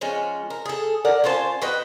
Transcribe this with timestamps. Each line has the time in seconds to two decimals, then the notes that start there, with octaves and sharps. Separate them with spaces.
0.01 F3 G#3 C#4
0.50 A#4
0.66 G#4 A4
1.05 A#4 D5 F#5
1.24 C#4 F4 C5 A5
1.62 F#4 B4 D#5 G5